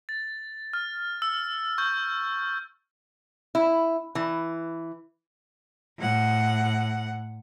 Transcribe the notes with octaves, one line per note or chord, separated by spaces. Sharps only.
A6
F6
E6
C#6 G6
E4
E3
A2 F#5